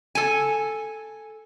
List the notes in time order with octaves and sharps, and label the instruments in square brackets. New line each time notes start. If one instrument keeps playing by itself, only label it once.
[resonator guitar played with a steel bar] A4 G#5